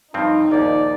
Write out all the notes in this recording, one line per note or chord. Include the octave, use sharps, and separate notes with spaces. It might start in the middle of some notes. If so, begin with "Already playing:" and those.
G2 F3 C4 D#4
A#1 D#2 D5